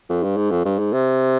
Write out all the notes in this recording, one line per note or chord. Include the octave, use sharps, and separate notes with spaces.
F2
G2
G#2
F2
G2
G#2
C3